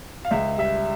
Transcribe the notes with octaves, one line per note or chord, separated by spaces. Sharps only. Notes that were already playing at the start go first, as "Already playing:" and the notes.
F5
C#2 E5
G3 E5